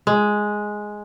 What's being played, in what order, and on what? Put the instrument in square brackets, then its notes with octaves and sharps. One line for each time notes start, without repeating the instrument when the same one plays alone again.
[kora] G#3